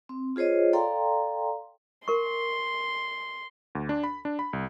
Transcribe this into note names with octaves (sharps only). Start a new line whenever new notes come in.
C4
F4 G#4 C5 C#5 D#5
A4 D5 F5 G5 A#5 C6
A#4 C6 C#6
D2
D4
B5
D4
B5
C2